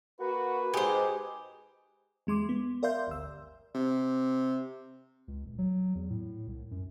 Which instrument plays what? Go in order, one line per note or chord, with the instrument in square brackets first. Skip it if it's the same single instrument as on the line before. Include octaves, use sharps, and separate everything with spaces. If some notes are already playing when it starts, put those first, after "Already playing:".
[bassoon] A#3 [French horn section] F#4 [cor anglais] B4
[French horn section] G#2 [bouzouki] G4 C5 [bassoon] G#4
[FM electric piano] E2 G#3 C6 D6
B3
A#4 D5 E5 F5 C6 G6
G1 D2 E6
[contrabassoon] C3
[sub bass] C#2
D#1
F#3
E2
A2
C2
F#2